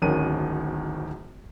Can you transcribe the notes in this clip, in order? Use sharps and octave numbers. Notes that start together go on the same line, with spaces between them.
D1 G#1 D#3 C#4 D#7